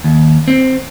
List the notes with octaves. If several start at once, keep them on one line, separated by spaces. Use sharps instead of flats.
D#2
C4